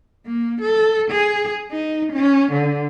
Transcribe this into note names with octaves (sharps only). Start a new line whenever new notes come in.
A#3
A4
G#4
D#4
C#4
D3